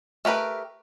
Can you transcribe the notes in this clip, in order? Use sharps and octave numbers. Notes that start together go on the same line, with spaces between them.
A3 G4 A#4 B4